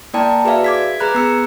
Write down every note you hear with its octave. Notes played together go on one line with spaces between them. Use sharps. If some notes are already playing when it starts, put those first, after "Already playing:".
A#3 E4 D5 G5 A5 A#5
F#4 G#4 B4 D5 E5 F5
D6 G#6 B6
G#4 B4 A#5 B5 F#6 G#6
B3 E6 C#7